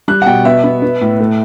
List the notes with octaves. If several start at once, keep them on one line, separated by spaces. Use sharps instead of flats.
G3 F#6
F#5
B2 G5
B3 E5
B3
B3
A2
A3